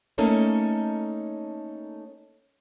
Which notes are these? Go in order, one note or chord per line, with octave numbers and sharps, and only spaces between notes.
A3 A#3 C#4 D#4 A4 C#5